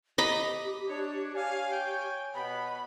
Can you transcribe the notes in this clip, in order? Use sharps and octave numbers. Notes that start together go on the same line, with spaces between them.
G4 D#5 A#5 B5
D4 C#5
C#5 F5 G#5
G5
B2 B3 B5